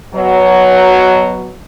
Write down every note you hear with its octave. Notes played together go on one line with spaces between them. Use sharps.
B2 F#3